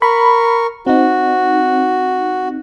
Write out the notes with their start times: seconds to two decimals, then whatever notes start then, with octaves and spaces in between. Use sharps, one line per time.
0.02 A#4 B5 C#6
0.87 C4 D#4 F#4